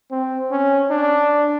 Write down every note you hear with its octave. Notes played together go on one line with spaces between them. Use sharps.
C4
C#4
D4